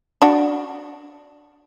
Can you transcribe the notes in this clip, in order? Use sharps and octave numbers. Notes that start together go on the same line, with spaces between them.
D4 F#4